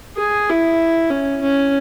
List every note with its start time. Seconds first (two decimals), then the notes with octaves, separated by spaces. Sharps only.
0.18 G#4
0.49 E4
1.10 C#4
1.41 C#4